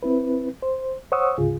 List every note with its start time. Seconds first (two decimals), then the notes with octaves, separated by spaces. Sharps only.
0.03 C4 E4 B4
0.62 C5
1.12 C5 C#5 F#5 C#6 D#6 E6
1.38 D2 G#2 C#3 F4 G#4